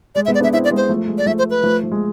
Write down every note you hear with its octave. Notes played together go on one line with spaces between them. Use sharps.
G#3 D5
E5
G#3 B3
D5
B3 D4 E5
C4 E4 E5
D5
G#3 B3
C5
F3 A3
G#3
D5
F3 A3 E5
C5
B4
F3 A3
F3
G#3